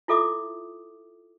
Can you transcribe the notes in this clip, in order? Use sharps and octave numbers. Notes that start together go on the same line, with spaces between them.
E4 F4 A4 E5 D6 D#6